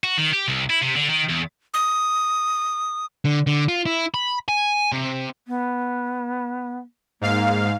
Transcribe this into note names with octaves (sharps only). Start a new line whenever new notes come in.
F#4
D#3
G4
C2
E4
C3
D3
D#3
E2
D#6
D3
D3
F4
E4
B5
G#5
C3
B3
G#2 A#3 F5